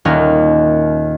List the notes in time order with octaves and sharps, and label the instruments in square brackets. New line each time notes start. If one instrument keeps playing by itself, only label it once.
[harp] D#1 D#2 C#4 A#4